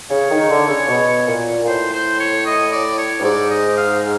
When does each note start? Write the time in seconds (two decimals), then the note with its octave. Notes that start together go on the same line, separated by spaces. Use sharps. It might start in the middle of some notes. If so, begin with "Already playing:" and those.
0.10 C#3 C#5
0.30 D#3
0.49 D3
0.69 C#3
0.88 B2
1.28 A#2
1.63 A#2
1.67 A2 C5
1.93 C5
2.20 C#5
2.46 D#5
2.72 D5
2.98 C#5
3.19 G2
3.24 G#2 D5
3.50 D#5
3.77 F5